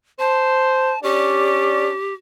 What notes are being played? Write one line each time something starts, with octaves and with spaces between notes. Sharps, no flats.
C5 A5
C#4 D4 G4 D5